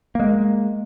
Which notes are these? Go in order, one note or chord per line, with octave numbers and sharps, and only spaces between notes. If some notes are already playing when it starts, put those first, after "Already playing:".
G#3 A#3